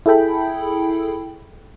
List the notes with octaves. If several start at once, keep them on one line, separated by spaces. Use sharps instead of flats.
E4 G#4 A4 G5 B5